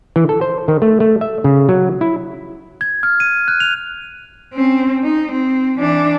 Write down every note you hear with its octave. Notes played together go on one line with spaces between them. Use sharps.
E3
A4
C5
D#3
A3
A3
E5
C#3
F#3
E4
G#6
F6
D#7
F#6
F7
C4 C#4
D#4
C4
E3 D4